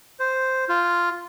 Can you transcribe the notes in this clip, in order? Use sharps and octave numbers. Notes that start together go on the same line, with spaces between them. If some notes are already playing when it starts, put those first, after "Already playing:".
C5
F4